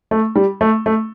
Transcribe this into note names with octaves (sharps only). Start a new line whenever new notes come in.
A3
G3
A3
A3